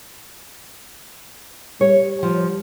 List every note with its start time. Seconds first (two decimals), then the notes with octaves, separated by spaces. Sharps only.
1.81 G3 C#5
2.23 F3